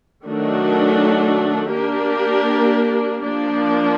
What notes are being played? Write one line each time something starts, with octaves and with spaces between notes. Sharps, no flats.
D#3 F#3 A3 D4 F#4
A#3 D4 G4 A#4
F3 A#3 D4